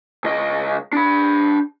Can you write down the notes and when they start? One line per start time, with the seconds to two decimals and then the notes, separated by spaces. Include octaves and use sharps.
0.24 C#2 D#5
0.93 D4 B5